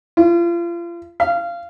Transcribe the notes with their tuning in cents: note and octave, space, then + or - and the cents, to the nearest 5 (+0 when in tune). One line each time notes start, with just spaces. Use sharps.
F4 -35
F5 -20